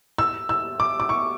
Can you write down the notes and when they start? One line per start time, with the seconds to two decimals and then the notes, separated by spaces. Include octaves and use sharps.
0.18 E6
0.49 E6
0.80 D6
1.00 D6
1.09 C#6